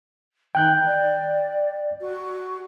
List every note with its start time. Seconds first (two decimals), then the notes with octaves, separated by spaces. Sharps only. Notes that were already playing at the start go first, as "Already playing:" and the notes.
0.55 D#3 G5 F#6 G6
0.85 D5
2.00 F#4